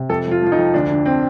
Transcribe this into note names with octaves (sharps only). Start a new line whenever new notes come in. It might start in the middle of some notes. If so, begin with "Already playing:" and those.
Already playing: C3
F2 A4
F3 F4
F3 F4
D#4
F2
D2 D4
D3
C4